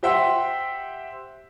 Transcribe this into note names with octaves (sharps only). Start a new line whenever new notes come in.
G4 C5 E5 F#5 G5 C6